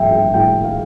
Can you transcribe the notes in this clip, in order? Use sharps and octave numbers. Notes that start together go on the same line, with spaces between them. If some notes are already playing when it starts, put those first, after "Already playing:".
Already playing: A2 F3 E5 G5
G5
A2 G5
F5